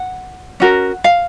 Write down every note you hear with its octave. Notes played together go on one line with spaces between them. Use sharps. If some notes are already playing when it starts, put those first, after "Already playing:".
Already playing: F#5
C#4 F#4 A#4
F5